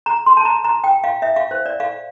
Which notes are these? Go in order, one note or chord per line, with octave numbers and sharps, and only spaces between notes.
A#5
C6
A5
A#5
A#5
G5
F5
E5
F5
C5
D5
F5